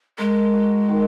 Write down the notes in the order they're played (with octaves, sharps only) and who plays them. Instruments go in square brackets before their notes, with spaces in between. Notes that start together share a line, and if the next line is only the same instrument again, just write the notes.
[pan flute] G#3 [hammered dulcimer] A#4
[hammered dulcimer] F#4
D#3